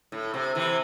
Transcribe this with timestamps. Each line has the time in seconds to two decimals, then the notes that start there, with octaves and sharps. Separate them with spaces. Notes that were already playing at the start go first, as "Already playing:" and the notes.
0.12 A2
0.34 C3
0.55 C3 E3